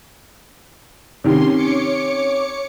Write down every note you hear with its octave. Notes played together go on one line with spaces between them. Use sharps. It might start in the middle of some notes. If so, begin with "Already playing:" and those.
C3 D#3 C#4 C6
C#5 D6 C#7